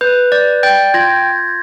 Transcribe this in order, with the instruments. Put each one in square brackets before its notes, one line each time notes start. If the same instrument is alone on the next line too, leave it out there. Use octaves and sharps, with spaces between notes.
[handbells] B4 [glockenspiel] G6
[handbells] D5 [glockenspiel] G6
[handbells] G5 [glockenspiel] G6 A6
[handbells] F4 [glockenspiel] G#6 A#6